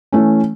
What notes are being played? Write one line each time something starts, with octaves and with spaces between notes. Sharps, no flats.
E3 A3 C#4